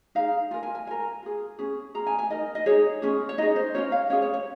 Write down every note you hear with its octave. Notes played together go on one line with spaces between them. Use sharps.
D#4 G#4 F5
F4 A#4 G#5
G#5
G#5
F4 A#4 G#5
F4 G#4
C#4 G#4
F4 G#4 A#5
G#5
G#5
D#4 A#4 D#5
D#5
D#4 G#4 C#5
C#4 F4 G#4
C#5
D#4 G#4 D#5
C5
C#4 F4 A#4 C#5
F5
C#4 F4 G#4 C#5
C#5
C#5